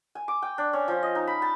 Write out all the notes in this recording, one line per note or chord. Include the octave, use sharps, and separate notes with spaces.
G#5
D6
G5
D4
C#4
F3
D#5
D#4
B5
A5